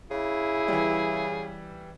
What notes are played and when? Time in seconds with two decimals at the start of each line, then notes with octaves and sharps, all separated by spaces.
0.11 C#3 E4 G#4
0.68 E3 G3